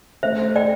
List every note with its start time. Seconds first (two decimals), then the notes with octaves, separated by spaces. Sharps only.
0.23 A3 C5 E5
0.55 A4 D5 G5